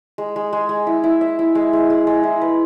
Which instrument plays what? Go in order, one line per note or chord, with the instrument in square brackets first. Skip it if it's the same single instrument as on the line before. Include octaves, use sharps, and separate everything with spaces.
[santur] G#3
G#3
G#3
G#3
E4
E4
E5
E4
G#3
G#3
G#3
G#3
E4
B4